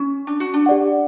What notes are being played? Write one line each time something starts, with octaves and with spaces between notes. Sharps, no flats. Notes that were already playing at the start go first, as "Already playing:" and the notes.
Already playing: C#4
D4
F#4
D4
G4 D5 F#5